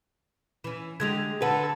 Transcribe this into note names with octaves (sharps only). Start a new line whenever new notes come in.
E3 C#4
D3 G#3 G4 G#6 F7
D3 A4 B4 F#5